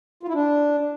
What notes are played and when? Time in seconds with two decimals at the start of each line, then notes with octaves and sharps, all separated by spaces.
0.23 F4
0.28 E4
0.34 D4